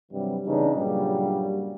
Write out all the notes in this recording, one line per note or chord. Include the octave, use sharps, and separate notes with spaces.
G2 C3 E3 F#3 G3
C#3 E3 C4 D4 D#4
G2 A#2 C#3 F#3 G3